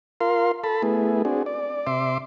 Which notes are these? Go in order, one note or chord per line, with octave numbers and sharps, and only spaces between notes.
F4 A#4 F5 C6
A4 A5 B5
A3 B3 E4 G#4
C4 D4 F#4 G#4
D5
C3 E5 C6 D6